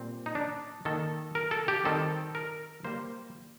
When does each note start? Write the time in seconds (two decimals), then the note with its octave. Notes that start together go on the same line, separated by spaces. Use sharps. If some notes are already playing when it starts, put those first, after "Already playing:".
Already playing: A#2 G3 C4
0.26 D#4
0.35 D4
0.85 D#3 A#3 A4
1.35 A#4
1.51 A4
1.68 G4
1.85 D#3 G3 C4 A4
2.35 A#4
2.84 G3 A#3 C5